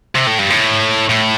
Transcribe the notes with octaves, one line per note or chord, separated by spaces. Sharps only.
C3
A2
G2
A2
A2